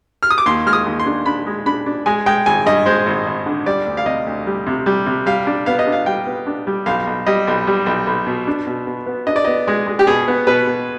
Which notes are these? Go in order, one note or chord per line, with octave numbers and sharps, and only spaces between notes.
F6
D#6
D6
D#2 C6
G#3 F6
D#6
D#2
C6
D4
D4 B5
G#3
D4 B5
D4
G#3 G#5
G#3 G5
G#1 G#5
G2 D#5
G#3 C5
G#1
G#1
D3
G3 D5
D2
F5
C3 D#5
D2
G3
C3
G3
C3
G3 F5
D4
B3 F5
D#5
D4
F5
G3 G5
B3
D4
G3
B1 F5
B1
G3 D#5
B1
G3
B1
B1
B2
D4
B2
B2
B3
D4 D#5
D5
B3 D#5
G#3
G#3
G4
B2 G#4
B3
B2 B4
B2